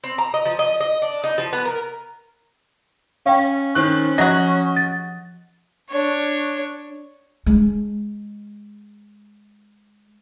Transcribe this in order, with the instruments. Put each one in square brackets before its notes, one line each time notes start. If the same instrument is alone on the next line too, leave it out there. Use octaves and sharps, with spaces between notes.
[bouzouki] C4
A#5
D#5
F3
D#5
D#5
D4
D#4
F3
B3
A#4
[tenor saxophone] C#4 [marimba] F5 G5
[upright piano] D#3 C4 F#6 [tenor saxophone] C#4
[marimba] F3 A#6 [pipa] F#3 F#4 [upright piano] D#5
[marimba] A6
[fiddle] D4 C#5
[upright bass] G#3 D4